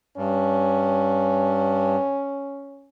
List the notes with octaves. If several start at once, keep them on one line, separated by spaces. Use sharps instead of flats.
G2 C#4